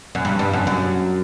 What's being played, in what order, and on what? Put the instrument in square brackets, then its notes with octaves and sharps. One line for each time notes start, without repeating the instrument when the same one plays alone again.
[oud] F#2
G2
G2
F#2
F#2